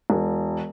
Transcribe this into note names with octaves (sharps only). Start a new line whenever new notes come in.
E1